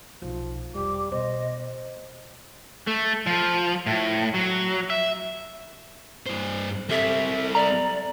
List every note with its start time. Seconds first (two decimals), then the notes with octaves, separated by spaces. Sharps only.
0.22 B1 F3
0.75 E1 G3 D6
1.12 B2 C5 D#5
2.87 A3
3.27 F3
3.86 A2
4.34 F#3
4.90 E5
6.27 G2 C5
6.90 G3 C4 A4 E5
7.55 D5 A#5